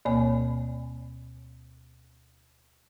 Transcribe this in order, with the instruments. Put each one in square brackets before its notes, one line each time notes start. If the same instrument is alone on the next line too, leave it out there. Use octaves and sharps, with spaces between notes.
[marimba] D2 B2 A#3 C#5 G#5